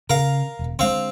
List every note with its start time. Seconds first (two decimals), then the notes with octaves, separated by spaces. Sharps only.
0.10 C#3 A#4 F5
0.59 E1
0.79 D3 G#3 C4 F5